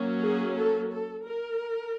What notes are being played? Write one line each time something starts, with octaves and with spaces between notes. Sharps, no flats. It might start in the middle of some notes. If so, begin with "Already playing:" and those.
Already playing: F#3 A#3 C#4
G#4
A4
A4
A#4